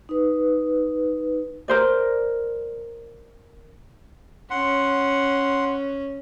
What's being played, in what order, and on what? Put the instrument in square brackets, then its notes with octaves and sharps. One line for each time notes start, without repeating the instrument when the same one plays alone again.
[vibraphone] D#4 B4
[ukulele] A#4 C5 D5
[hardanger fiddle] C#4 [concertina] F#5 C6